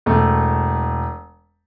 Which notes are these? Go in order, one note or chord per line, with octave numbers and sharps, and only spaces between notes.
E1 A3